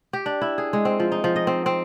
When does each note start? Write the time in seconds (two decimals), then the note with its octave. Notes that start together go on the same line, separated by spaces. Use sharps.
0.13 G4
0.26 D4
0.41 E4
0.58 G#4
0.73 G#3
0.85 C4
1.00 F3
1.12 D#4
1.24 F3
1.36 D#5
1.47 C4
1.66 C4